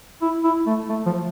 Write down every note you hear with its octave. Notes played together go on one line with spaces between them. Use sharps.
E4
E4
A3
A3
F3